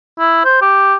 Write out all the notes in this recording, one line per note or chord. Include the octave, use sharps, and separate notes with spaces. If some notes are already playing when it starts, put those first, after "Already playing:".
E4
C5
G4